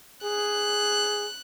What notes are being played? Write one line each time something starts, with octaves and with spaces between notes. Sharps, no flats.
G#4 F#6